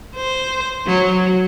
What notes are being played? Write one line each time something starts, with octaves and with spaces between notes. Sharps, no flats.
C5
F#3